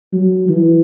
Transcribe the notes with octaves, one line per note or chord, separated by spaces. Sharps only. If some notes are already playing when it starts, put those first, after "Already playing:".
F#3
E3